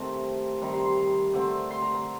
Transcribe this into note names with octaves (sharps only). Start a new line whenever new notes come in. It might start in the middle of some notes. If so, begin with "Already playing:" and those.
Already playing: C3 D#3 A3 C4 G5 A5
C3 D#3 G3 C4 A#5
C6
C6
A#5
D3 A3 C4
C6
A#5
A#5